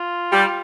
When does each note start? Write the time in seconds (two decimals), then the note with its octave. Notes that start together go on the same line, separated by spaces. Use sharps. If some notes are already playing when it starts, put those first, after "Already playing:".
Already playing: F4
0.32 G3